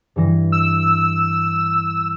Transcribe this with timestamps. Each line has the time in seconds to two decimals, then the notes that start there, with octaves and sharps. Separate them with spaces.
0.16 G2 E3 A#6
0.52 E6